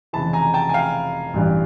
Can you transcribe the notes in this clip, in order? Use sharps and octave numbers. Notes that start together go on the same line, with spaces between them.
F1 F2 C#3 E3 A5 B5
G#5 A#5
G5 A5
G#5
F5 G5
A1 G2 E3